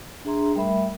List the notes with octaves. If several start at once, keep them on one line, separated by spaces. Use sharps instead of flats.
D4 G#4 E5 A#5 C6
G3 A3 A#4 E5 B5